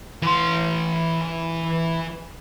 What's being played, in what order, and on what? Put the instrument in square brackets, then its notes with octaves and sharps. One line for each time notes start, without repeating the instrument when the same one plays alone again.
[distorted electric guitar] E3 C6